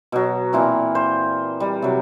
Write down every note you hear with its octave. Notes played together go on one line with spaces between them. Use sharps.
B2 F#3
A#2 E3 C4
C5
G3
C3 F#3